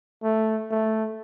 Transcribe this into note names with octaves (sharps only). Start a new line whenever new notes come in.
A3
A3